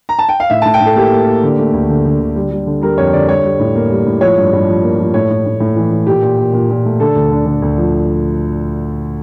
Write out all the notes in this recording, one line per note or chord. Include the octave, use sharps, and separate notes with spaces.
A#5
A5
G5
F5
A2 E5
A2 A5
G5
A2
A4
A#3 G4
A#3
A#3
D3
A3
D2
D3
D3
D3
G3
G3
D3
G3 A#4
F2 C#5
D3 D5
G3 C#5
G3
A2
A#3
G3
A2
F3 C#5
G2
G2
F3
A#3
F3
A2 C#5
A2
A2
A2
E3
E3
A#2 G4
A#2
A#2
A#2
A#2
A3
D3 A4
D2
D3
D3
D2
F3